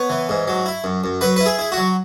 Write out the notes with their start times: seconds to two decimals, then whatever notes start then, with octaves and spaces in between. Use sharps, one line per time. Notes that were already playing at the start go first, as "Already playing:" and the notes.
Already playing: B3 C#5
0.10 E3
0.29 G#2
0.48 F#3
0.66 E4
0.84 F#2
1.04 F#2
1.21 F#3 B4
1.36 E4 B4
1.46 G#4
1.59 E4
1.72 F#4
1.78 F#3